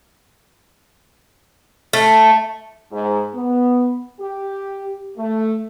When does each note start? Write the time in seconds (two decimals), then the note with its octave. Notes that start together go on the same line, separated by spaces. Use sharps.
1.93 A3
2.92 G#2
3.35 B3
4.20 G4
5.17 A3